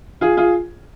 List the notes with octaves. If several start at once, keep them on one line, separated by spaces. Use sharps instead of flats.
F4 G#4
F4 G#4